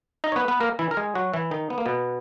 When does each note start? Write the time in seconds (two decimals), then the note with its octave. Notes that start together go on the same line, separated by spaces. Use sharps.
0.24 D#4 D#5
0.32 C#5
0.36 B3 B4
0.48 B3 B4
0.60 A#3 A#4
0.79 E3 E4
0.91 A#4
0.97 G#3 G#4
1.15 F#3 F#4
1.33 E3 E4
1.51 D#3 D#4
1.70 B3
1.78 A#3
1.86 B2 B3